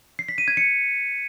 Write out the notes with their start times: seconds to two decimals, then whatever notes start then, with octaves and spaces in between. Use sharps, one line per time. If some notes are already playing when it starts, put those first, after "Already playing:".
0.19 C7
0.28 B6
0.38 D#7
0.48 G#6
0.57 C#7